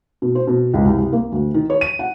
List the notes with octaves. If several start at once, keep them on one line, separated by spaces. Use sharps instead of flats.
B2
C5
B2
C#2
C2
C2
A#3
D2
D#3
C#5
D#7
F#5